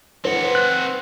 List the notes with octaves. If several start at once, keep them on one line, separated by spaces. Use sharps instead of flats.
C4 C5 F#5
B4
F#6